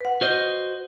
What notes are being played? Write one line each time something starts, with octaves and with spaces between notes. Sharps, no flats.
B4 F#5
F#4 C5 D#5 F6 G6